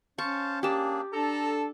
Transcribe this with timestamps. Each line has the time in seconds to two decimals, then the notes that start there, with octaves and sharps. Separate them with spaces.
0.18 C#4 C5 F5 A5 C#6
0.63 A#3 D4 G4 G#4 A5
1.12 D4 A4 A#5